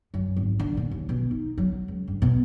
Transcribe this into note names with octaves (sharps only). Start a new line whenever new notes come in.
F#2
G#1
D3
A#2
D#2
B2
D#4
F#3
C#2
G2
B2